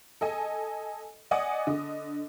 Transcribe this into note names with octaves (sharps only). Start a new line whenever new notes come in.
A4 D#5 G#5
D5 D#5 F#5 G#5 D6 D#6
D3 D#5